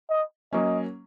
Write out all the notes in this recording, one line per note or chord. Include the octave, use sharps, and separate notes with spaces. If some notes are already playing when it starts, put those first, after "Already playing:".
D#5
F#3 A#3 C#4 D#5